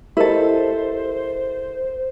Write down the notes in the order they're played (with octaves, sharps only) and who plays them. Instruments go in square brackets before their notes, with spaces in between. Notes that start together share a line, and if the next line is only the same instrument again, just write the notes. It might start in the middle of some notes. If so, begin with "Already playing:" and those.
[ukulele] E4 A4 [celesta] G4 A#4 D#5 [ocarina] C5